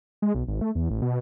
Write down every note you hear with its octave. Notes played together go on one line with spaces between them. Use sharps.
G#3
B1
G#1
A3
E2
A1
B2